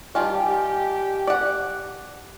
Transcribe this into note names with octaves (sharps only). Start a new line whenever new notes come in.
D#3 G3 F4 G4 G#5 A5
D5 F#5